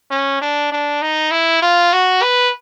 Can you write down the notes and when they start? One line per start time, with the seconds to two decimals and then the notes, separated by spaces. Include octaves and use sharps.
0.11 C#4
0.42 D4
0.72 D4
1.02 D#4
1.31 E4
1.62 F4
1.93 F#4
2.22 B4